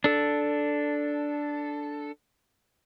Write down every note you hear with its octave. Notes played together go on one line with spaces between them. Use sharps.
D4 A4